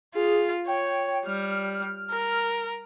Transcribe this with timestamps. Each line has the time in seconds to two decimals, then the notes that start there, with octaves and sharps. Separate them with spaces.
0.15 F4 G#4
0.67 C#5 G5
1.26 G3 F6
2.11 A#4